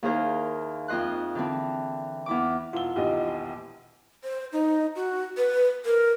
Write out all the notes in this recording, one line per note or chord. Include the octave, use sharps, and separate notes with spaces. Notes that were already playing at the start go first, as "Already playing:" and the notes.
D#2 E4 G#4 A#4 C5
F2 F4 D#5 C6 F#6
D3 E3 C4
E2 E4 D6
E1 E4 F4 F#5 E6 G7
E1 A#1 D#3 G4 D#5
C5
D#4
F#4
B4
A#4